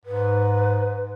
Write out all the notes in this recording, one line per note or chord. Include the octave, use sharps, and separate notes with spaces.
G#2 B4